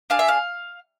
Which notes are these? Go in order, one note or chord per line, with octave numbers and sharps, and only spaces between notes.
D4 G#4 F5
E5
F5